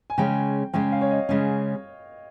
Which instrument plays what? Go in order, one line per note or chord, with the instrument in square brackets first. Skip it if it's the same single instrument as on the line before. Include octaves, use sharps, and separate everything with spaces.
[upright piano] G#5
[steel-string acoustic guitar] C#3 G#3 C#4 [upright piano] G5
[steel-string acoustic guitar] C#3 G#3 C#4 [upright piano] G5
[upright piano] F5
C#5
D#5
[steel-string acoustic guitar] C#3 G#3 C#4